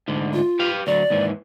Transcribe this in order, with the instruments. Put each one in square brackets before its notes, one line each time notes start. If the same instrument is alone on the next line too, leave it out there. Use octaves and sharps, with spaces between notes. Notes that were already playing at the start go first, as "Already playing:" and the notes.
[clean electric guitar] D2 G#2 D3
[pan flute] F4
[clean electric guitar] G4 B4 F5
[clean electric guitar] D2 F#3 [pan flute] D5
[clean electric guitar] D#2 G#2 E3